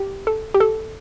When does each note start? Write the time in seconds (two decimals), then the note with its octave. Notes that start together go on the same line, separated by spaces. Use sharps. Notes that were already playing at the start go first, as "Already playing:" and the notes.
Already playing: G4
0.27 A4
0.54 G4
0.60 A4